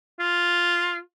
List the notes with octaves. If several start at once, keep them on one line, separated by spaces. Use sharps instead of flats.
F4